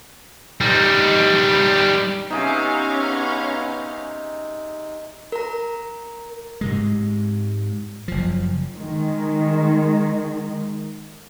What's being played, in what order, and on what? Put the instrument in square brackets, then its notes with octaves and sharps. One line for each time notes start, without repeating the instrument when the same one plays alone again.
[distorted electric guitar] G3 D#4
[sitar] C3 [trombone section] B3 [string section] C#4 F5 A#5 [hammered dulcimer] D#4 G#4
[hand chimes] A#4 A#5
[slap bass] G#2 C3 G#3
F#1 F3
[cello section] D#3 G#3